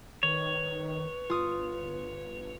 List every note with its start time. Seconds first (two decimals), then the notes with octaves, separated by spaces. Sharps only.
0.23 D#3 B4 C#5
1.30 G1 F4 D#6